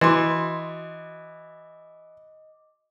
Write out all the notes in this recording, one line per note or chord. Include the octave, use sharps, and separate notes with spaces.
E3 F#4 D#5 C6 D6